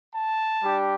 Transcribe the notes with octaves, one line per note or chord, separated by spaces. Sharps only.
A5
G3 D4 G4